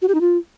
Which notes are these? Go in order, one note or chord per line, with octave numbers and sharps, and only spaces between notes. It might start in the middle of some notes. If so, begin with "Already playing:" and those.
F#4
G4
D#4
F4